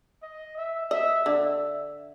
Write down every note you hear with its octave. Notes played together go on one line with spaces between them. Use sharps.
D#5
E5
D#5 E5
D3 E5